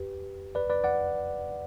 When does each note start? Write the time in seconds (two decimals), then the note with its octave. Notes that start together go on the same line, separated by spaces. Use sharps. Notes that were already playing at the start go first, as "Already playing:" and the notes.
Already playing: G4 B4
0.55 B4 D5
0.69 B4 D5
0.84 D5 F#5